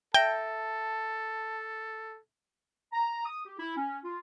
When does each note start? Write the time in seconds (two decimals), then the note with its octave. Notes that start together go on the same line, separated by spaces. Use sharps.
0.14 A4 E5 G5 A5 A#6
2.92 A#5
3.25 D#6
3.46 G4
3.58 E4
3.76 C#4
4.04 F4